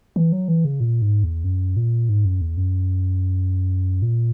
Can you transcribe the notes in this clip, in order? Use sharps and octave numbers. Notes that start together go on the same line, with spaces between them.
E3
F#3
E3
C#3
A#2
G#2
E2
F#2
A#2
G#2
F#2
E2
F#2
A#2